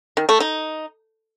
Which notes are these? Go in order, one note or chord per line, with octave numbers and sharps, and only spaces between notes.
D#3
A3
D#4